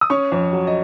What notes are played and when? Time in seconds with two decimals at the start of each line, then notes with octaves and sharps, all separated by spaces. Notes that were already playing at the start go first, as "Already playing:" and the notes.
0.01 D#6
0.10 C#4 C#5 C#6
0.32 F2
0.53 F#3
0.67 D#5